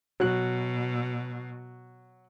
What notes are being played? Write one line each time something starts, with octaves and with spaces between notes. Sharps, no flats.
B2 F#3 F#6